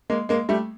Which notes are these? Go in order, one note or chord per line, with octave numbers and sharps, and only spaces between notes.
G#3 A#3
G#3 A#3
G3 A3